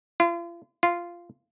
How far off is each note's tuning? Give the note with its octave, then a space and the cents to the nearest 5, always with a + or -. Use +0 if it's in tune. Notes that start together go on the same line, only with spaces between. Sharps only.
F4 -40
F4 -10